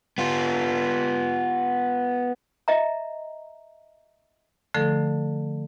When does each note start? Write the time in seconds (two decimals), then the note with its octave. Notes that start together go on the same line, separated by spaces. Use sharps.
0.18 B3 F4
2.68 D#5 E5 A#5
4.74 D3 F3 A3 A4